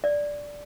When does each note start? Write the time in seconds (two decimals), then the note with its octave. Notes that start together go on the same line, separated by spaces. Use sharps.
0.04 D5